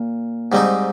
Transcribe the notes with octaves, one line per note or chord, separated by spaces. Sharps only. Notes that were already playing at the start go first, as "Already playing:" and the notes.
Already playing: A#2
G#2 G3 C4 D#4